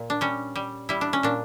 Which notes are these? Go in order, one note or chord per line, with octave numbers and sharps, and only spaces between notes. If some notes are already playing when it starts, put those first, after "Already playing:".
Already playing: A#2
D4
G3 C#4
G3
G3 E4
D4
C#4
A#2 D4